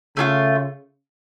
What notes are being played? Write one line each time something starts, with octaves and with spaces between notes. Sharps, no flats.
C#3 A3 D4 F4